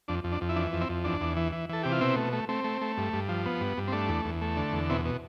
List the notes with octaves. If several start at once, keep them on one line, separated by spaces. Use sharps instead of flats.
F2 D4
F2
D4
F2
E4
E3 D4
F2
C4 E4
F2
E2 D4
E2
E3
E3
E3 A4
C3 G4
F4
B2 C4 E4
A3
A3
A3 C4
A3
A3
G2
G2
F3
B3
G2
G2
C4
A3 D4
E2
E2
A3
D3
E2
B2 C4 E4
B2